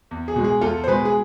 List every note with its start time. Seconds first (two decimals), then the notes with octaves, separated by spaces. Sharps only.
0.11 E2
0.28 G#4
0.36 B2 G#3
0.44 G#4
0.61 E2 F4 A4
0.84 C5
0.87 B2 G#3 G#4 B4
1.05 G#4